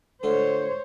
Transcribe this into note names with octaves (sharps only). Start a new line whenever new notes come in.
D3 A3 F4 C5 C#5